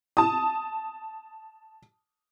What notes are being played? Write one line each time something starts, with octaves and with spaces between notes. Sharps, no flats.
A5 D#6